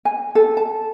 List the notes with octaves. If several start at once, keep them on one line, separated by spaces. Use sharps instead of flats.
G#5
A4
A5